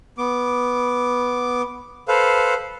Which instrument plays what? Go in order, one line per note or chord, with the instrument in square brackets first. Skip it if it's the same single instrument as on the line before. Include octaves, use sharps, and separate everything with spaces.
[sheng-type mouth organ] B3 D6
A4 B4 C5 F5